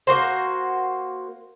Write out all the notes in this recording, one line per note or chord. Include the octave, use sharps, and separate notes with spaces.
A#3 F#4 C5